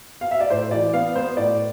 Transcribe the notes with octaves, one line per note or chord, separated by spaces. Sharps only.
F5
E5
D5
A2 C5
E3 D5
B3 F5
B3 C5
A2 D5